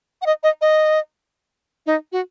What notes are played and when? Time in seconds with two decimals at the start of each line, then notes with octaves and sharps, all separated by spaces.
0.22 F#5
0.26 D#5
0.43 D#5
0.61 D#5
1.86 D#4
2.12 F#4